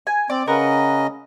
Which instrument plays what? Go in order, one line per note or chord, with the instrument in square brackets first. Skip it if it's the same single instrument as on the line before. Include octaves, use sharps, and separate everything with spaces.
[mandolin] G#5
[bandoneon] C4 [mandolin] D5
[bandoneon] C#3 C#4 D#5 [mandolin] A#4 B4 F#5